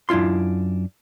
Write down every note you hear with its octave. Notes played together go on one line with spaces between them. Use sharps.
F#2 D4 E4 F4 C6